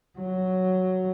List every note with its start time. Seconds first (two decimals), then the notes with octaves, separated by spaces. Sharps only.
0.19 F#3